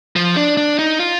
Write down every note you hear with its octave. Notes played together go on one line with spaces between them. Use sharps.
F3
D4
D4
D#4
F4